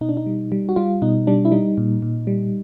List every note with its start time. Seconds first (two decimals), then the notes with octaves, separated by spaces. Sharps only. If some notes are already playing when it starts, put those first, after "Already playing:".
0.01 B2 D#4
0.09 D4
0.17 D#4
0.26 G3
0.52 G3
0.69 F#4
0.76 G3 F4
1.02 B2 D#4
1.27 G3 D4
1.45 E4
1.52 G3 D#4
1.78 A#2
2.02 A#2
2.27 G3